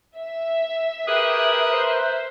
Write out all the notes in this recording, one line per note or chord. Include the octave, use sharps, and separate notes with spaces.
E5
G4 G#4 A#4 B4 G5 D#6 F#6
C5